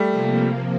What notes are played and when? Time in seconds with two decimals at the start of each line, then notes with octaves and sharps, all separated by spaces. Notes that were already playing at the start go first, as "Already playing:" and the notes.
Already playing: G3 A3
0.10 C3 F3 A#3